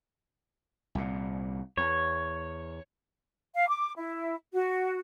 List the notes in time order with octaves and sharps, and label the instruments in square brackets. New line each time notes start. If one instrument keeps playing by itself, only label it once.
[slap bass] C2 A#2
[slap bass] E2 [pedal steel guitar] C#5
[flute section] F5
D6
E4
F#4